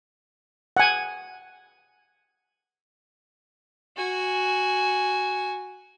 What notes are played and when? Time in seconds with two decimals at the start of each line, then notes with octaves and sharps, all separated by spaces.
0.77 F#5 G#5
3.97 F#4 G#5